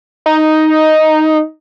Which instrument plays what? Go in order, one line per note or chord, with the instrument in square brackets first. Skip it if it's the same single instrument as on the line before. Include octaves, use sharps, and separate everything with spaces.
[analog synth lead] D#4